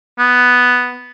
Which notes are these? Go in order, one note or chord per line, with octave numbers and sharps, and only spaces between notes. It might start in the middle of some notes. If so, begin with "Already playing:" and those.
B3